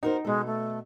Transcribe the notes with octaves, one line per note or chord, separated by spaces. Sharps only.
D#4 F#4 A#4 C5
B2 G#3 A4
A3